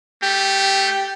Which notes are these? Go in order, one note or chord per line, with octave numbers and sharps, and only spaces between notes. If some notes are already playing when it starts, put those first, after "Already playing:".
A3 G4